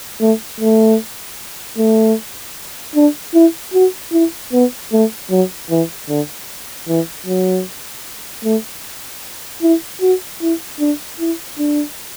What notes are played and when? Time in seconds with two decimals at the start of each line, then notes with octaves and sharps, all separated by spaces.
0.21 A3
0.60 A3
1.78 A3
2.95 D4
3.34 E4
3.74 F#4
4.13 E4
4.53 B3
4.92 A3
5.30 F#3
5.70 E3
6.09 D3
6.88 E3
7.26 F#3
8.44 A3
9.62 E4
10.01 F#4
10.41 E4
10.80 D4
11.20 E4
11.58 D4